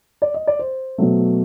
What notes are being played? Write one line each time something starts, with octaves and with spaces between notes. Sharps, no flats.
D5
D#5
D5
C5
B2 F#3 A3